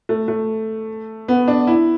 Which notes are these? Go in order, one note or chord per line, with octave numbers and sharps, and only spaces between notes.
A3
A3
B3
D4
E4